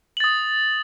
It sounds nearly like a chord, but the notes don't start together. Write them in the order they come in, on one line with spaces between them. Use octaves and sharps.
F#7 A6 D#6